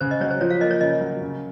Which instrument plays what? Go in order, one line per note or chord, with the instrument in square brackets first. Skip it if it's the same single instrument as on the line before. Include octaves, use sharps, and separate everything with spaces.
[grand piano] C#3 [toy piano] C5
[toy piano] D#5
[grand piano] F#3 [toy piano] C#5
[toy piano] C5
[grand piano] F3 [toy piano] C#5
[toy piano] F5
[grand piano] A#3 [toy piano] D#5
[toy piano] C#5
[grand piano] C#3 [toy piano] D#5
[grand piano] F#3
C#3